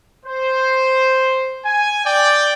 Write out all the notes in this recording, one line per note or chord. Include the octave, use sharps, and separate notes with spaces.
C5
G#5
D5 G5